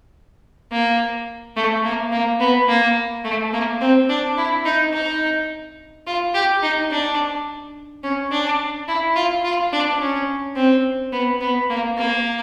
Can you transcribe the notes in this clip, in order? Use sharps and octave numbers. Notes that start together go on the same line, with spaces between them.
A#3
A3
A#3
A#3
B3
A#3
A3
A#3
C4
D4
E4
D#4
D#4
F4
G4
D#4
D4
C#4
D4
E4
F4
F4
D4
C#4
C4
B3
B3
A#3
A#3